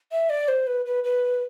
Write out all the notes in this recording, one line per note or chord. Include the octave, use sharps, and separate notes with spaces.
E5
D5
C5
B4
B4
B4